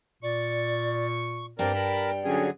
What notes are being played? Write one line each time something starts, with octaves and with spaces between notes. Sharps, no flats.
A#2 D5 C#6
G2 G3 C4 A#4 D5 G5
A#4 A5 B5
D3 F#3 C#4 G#4